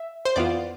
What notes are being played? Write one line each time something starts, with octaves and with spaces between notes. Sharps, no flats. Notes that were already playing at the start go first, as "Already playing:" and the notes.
Already playing: E5
C5
F2 E3 B3 F4 D5